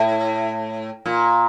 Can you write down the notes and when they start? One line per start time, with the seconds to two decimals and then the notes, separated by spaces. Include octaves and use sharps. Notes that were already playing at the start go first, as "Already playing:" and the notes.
Already playing: A2
1.06 A#2